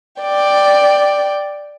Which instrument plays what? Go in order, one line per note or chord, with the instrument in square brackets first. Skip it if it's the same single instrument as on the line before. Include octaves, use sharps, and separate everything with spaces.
[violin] D5 G5